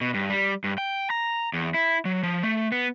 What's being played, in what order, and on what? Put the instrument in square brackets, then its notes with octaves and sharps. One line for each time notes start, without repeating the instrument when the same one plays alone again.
[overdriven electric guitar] B2
G2
G3
G2
G5
A#5
E2
E4
F#3
F3
A3
B3